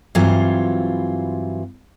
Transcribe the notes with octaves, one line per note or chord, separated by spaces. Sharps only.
G2 E3 F#3 C4 F4